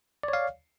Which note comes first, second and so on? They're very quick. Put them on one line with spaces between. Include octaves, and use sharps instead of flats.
D5 C#5 F5